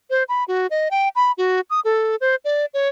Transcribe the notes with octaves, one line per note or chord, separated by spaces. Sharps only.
C5
B5
F#4
D#5
G5
B5
F#4
D#6
A4
C5
D5
C#5